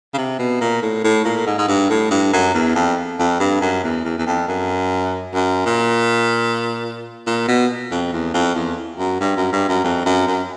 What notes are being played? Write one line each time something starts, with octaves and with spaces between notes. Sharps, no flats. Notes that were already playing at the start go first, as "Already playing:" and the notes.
C#3
C3
B2
A#2
A2
A2
A#2
G#2
G#2
G2
A2
G2
F#2
E2
F2
F2
G2
F#2
E2
E2
E2
F2
F#2
F#2
A#2
A#2
B2
F2
E2
F2
E2
F#2
G2
F#2
G2
F#2
F2
F#2
F#2